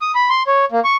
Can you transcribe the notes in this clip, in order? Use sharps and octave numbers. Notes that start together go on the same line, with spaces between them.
D#6
B5
C6
C#5
A#3
C#6